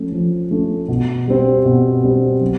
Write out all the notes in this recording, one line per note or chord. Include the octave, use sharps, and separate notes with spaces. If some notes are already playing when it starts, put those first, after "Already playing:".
Already playing: F3 A3 C#4
F3
A3 C#4
B2
G3 C4
B2
G3 C4
F#3